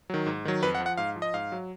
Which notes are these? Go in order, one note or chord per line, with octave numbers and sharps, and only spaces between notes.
D#3 F#3
G#2
D#3 F#3
F2 B4
F#5
F3
F#5
G#2 F5
F3
D#5
G#2 F5
F#3